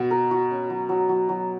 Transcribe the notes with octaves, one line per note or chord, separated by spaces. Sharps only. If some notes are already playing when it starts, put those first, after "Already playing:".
Already playing: B2 F#4
A#4
F#4
C#4
F#3
F#3
F#3
F#3